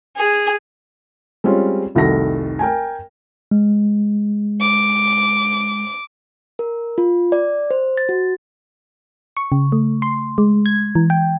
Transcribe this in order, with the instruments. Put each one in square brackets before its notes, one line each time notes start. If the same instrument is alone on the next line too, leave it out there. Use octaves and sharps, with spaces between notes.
[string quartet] G#4
[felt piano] G3 G#3 C4 C#4 F4
F1 C2 D#3 F#4 A4 A#6
A#4 G5 G#5
[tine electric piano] G#3
[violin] D6
[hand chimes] A#4
F4
D5
C5
A6
F#4
[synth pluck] C#6
C#3
A3
C6
G#3
G#6
E3
G5